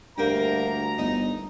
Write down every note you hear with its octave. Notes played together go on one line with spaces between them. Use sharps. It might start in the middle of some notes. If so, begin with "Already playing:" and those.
D2 G2 A#3 G5 A#5
G1 D#4